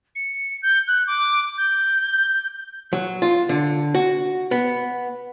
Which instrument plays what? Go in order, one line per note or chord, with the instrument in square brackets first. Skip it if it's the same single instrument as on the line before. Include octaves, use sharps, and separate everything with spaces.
[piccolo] C#7
G6
F#6
D6
G6
[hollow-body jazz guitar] F#3
F4
D3
F#4
B3